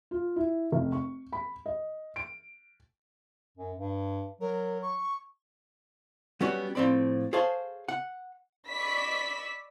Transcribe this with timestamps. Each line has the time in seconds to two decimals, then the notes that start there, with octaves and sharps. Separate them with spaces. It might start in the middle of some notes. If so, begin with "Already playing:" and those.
0.11 F4
0.36 E4
0.72 F1
0.92 C#6
1.33 B5
1.66 D#5
2.16 D7
3.58 F#2
3.77 G2
4.41 F#3 A#4
4.82 C#6
6.41 F#3 G3 B3 C#4 F#4
6.75 A2 F3 C4 D5 B5
7.33 G#4 A4 C5 C#5 F5 A5
7.88 F#5
8.69 D5 D#5 B5 C#6 E6 B6